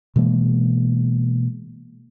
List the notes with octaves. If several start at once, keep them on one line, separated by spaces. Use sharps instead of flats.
B2 E3 G#3 A#3